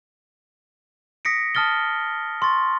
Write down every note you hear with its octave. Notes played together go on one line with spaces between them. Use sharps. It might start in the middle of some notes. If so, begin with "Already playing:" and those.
D#6 A#6 B6 C#7 D7
A5 D#6 F6 A6 G7
C6 C#6 A6